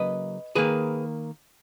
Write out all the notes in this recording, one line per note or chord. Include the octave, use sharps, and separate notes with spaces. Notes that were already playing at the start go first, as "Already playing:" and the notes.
Already playing: C#3 F#3 A#3 B4 D#5
D#3 A#3 G#4 B4